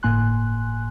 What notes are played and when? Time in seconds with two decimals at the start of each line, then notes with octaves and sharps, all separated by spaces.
0.03 G1 A2 A#3 G#5 C6 F#6